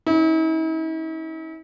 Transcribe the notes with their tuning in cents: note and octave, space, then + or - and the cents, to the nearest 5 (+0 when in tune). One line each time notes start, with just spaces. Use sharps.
C#4 +0 E4 -45